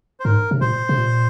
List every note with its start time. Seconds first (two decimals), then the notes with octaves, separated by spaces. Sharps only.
0.20 C5
0.24 G#2 A#4
0.51 C3
0.61 A#2 C5
0.89 C3
0.98 A#2